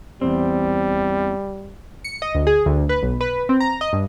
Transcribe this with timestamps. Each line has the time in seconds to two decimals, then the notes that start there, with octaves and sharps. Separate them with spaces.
0.21 E2 A#2 G3 C4
2.04 C#7
2.22 D#5
2.35 D2
2.47 G#4
2.66 D2
2.89 B4
3.03 B1
3.21 B4
3.49 C4
3.60 A#5
3.81 D#5
3.93 G2